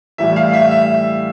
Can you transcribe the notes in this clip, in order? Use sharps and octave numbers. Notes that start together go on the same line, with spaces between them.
A2 E3 G3 E5
F5
E5
E5